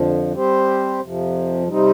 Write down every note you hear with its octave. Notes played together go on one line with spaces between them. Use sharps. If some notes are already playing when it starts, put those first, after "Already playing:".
Already playing: F2 D3 F3
G3 C4 G4 C5
F2 C3 F3
C3 G3 C4 D#4